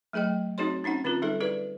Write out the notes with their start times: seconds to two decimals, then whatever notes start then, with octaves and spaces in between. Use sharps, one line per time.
0.13 F#3 A3 G#4 D#5 G5
0.58 C4 D#4 F#4 G#4 C#5 C6
0.84 C4 C#4 D#4 F#5
1.04 D3 C4 C#4 F4 A#4
1.22 G3 D#4 G#4 A4
1.40 E4 G#4 B4 D5